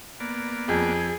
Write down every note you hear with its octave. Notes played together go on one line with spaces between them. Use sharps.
A#3 B3 D5
F2 G#4